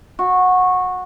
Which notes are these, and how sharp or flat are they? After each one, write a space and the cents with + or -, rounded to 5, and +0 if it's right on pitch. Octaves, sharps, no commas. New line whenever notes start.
F#4 -15